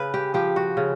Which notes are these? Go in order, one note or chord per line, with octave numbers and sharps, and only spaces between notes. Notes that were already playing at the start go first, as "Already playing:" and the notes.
Already playing: C#3 B4
G4
F3 G4
F#4
C#3